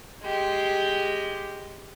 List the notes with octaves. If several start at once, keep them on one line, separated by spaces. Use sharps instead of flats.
G#3 G4